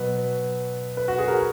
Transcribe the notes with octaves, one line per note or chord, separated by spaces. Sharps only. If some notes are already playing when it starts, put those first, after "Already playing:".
Already playing: B2 F#3 B3 B4
B4
F#4
G#4
A#4